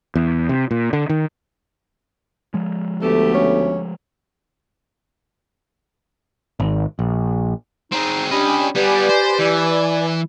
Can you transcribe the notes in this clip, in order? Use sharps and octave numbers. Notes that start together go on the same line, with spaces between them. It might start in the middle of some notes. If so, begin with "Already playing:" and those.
E2
C3
A#2
D3
D#3
F3 G#3
D2 A3 B3 G4 A4
C#4
G#1
A#1
C4 D#4 G#4
C#4 D4 G4 D#5 G#5 B5
G3 B3 G4 B4 D5 G#5
C5
E3